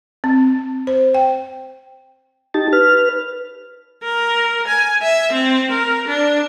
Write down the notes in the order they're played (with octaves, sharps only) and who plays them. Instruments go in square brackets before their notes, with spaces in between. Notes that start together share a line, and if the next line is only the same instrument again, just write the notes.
[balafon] C4
C5
G5
[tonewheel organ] D#4 G4 A5
B4 F6
[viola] A#4
G#5
E5
C4
A#4
D4